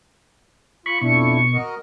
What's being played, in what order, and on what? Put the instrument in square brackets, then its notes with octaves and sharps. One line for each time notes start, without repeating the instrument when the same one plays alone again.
[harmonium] F4 [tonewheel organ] B5 C#6
[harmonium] F2 D4 E4 [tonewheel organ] B2 C#6
[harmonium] F#4 A#4 D#5